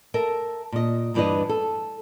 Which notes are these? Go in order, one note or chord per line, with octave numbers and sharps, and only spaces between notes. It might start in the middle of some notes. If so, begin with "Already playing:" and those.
A4 A#4 E5
A#2 D#5
D2 G2 E3 D4 B4 D#5
A4